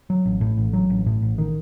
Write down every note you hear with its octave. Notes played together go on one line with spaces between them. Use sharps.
F#3
A1
A2
A1
F#3
A1
A2
A1
D#3